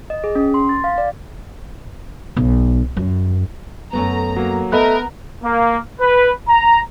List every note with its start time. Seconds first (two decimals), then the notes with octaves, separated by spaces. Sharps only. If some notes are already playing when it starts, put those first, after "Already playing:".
0.10 D#5
0.24 G#4
0.35 C#4
0.54 C6
0.69 A6
0.84 F5
0.98 D5
2.36 B1
2.97 F#2
3.93 F#2 A3 B3 A#5
4.36 F#3 A#3
4.72 A3 B3 A#4 D#5 A#5 B5 F#6
5.43 A#3
6.00 B4
6.48 A#5